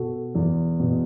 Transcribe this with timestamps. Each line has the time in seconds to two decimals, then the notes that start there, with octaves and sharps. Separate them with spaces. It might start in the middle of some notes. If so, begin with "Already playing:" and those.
Already playing: B2 F#4 A4
0.35 E2
0.80 B2